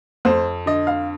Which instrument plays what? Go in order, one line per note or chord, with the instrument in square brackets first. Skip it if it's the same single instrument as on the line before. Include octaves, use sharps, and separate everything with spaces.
[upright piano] F2 C5
D3 D#5
F5